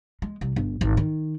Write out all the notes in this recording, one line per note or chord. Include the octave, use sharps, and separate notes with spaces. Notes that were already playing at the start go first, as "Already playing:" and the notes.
G#3
C2
G1
G#1
D#3